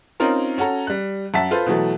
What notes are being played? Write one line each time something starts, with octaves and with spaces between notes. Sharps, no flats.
C4 C#4 D#4 F4 A#4
C#4 F#4 A4 A#5
G3 F#6
F#2 E5 F#5 A5 B6
F4 A4 B4 C5
B2 E3 F#3 A3